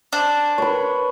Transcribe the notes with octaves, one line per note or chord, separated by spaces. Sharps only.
D4 C5
B4 C#5